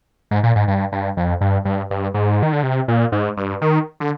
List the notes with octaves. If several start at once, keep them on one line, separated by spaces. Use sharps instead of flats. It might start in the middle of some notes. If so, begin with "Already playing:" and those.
G#2
A#2
G#2
G2
G2
F2
G2
G2
G2
G#2
D#3
D3
C3
A#2
G#2
G2
D#3
D3